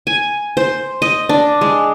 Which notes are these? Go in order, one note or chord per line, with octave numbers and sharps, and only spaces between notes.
G#5
C5
D#5
D4
G#3